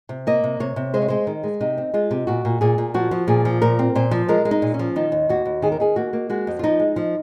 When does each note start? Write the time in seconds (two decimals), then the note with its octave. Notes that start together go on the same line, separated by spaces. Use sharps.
0.09 C3
0.27 A#3 D#5
0.44 C3
0.60 C3 C#5
0.76 C3
0.94 G#3 C5
1.02 C#5
1.08 G#3 C5
1.27 D#3
1.44 G#3
1.61 C3 D#4
1.78 C4
1.94 G#3 F4
2.11 C3
2.27 A#2 F#4
2.45 A#2
2.61 A#2 G#4
2.78 A#2
2.94 F3 F#4
3.11 F3
3.28 A#2 G#4
3.45 F3
3.62 A#2 A#4
3.79 C4
3.95 A#2 C5
4.11 F3
4.28 G#3 A#4
4.45 G#3
4.51 D#4
4.62 A#2
4.74 C#4
4.79 F3
4.96 D#3 D#4
5.12 D#2
5.29 D#2 F#4
5.45 D#2
5.62 D#3 G#4
5.72 A#4
5.80 D#3 G#4
5.96 A#3 F#4
6.13 A#3
6.30 G#3 F#4
6.47 F2
6.59 F4
6.63 F3 D#4
6.80 G#3
6.96 F3